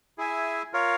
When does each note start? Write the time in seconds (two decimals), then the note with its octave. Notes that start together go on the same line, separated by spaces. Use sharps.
0.18 E4 G#4 E5 G#5
0.73 F4 A#4 C#5 F5